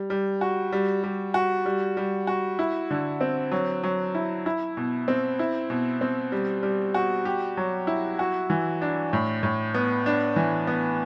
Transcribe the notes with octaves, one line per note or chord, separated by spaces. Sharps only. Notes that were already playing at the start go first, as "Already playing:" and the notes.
Already playing: G3
G3
F#4
G3
G3
F#4
G3
G3
F#4
E4
D3
C4
F#3
F#3
E4
E4
B2
C4
E4
B2
C4
G3
G3
F#4
G4
F#3
E4
F#4
E3
D4
A2
A2
B3
D4
E3
B3